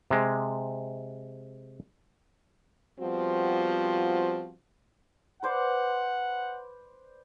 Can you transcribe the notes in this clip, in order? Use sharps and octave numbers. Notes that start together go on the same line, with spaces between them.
C3 G#3
F3 G3 B3 C4 F4 F#4
B4 C5 D5 F#5